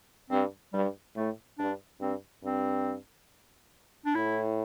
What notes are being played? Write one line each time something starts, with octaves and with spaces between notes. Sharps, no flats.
G2 C4
G2 G3
A2 A3
G2 D4
G2 C4
G2 C4
D4
A2 E4